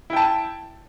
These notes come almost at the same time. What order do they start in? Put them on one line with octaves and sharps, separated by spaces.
E4 G5 A5